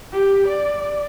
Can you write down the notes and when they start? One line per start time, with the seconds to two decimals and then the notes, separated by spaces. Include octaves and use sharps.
0.12 G4
0.47 D5